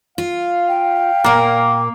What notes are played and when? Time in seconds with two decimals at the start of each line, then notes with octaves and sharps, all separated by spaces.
0.18 F4 F5
0.68 G5
1.24 A#2 A#3 A#4